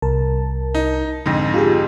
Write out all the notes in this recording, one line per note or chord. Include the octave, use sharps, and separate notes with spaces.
C2 A#4 A5
D#4
F2 G#2 D3 A#6
F4 G4 G#4